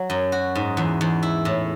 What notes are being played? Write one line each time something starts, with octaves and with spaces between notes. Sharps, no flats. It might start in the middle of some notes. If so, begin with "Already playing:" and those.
Already playing: F#3
F#2
F#4
G#2
E2
E2
E4
A2